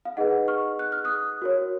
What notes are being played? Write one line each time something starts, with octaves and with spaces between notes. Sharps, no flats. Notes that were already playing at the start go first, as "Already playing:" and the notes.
F5
D#4 G#4 B4 D#5 F#5
C#6 F6
F#6
F6
D#6 F#6
F#4 A#4 C#5